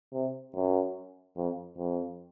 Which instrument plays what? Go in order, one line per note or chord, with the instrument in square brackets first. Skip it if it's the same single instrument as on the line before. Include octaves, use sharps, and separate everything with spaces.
[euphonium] C3
F#2
F2
F2